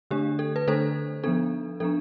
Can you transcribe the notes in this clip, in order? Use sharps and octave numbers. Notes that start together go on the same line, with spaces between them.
D3 A3 D4 G4
A4
B4
D3 A3 D4 A4 C5
F3 B3 D4 A4
F3 B3 D4 A4